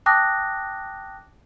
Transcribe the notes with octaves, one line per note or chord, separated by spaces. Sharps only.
G5 A5 D6 D#6 F#6 A#6